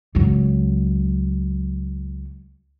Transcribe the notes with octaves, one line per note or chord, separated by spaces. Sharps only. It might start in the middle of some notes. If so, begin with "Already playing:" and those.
C#2 F#3